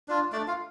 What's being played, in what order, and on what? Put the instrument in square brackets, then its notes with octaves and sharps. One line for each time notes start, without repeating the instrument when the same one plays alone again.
[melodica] D4 F4
A3 D4 D5
F4 F5